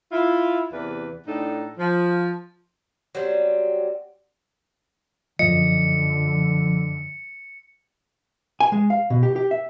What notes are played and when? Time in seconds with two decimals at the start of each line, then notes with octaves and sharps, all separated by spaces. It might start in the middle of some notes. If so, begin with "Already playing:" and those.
0.12 E4 F4
0.72 E2 C3 B4 D5
1.27 A2 D4 D#4 A4
1.78 F3
3.15 F#3 G3 B3 C4
5.39 F#2 D3 F3 D#5 C#7
8.60 G#5
8.72 G#3
8.90 F5
9.10 B2
9.23 G4
9.36 G4
9.51 E5